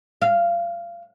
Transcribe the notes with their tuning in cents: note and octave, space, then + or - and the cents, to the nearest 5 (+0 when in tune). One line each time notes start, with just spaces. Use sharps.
F5 -25